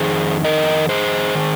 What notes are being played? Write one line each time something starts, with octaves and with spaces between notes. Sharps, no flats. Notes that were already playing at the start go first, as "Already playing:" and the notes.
Already playing: F2 D#3 G#4 C5
A#4 D#5
G#4 C5
D#3